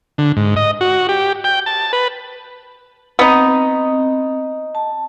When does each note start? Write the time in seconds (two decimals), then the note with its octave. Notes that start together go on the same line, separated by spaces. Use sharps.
0.18 D3
0.37 G#2
0.56 D#5
0.81 F#4
1.09 G4
1.44 G5
1.66 A5
1.93 B4
3.19 B3 C4 D#4
4.75 A5